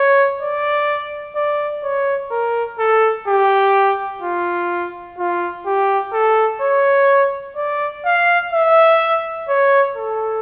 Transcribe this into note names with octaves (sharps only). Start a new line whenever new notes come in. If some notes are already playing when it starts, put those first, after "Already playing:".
Already playing: C#5
D5
D5
C#5
A#4
A4
G4
F4
F4
G4
A4
C#5
D5
F5
E5
C#5
A4